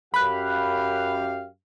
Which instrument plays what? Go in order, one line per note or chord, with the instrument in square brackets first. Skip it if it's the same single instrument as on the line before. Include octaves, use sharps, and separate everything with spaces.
[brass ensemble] F#2 G4 F5 [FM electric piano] B5 F#6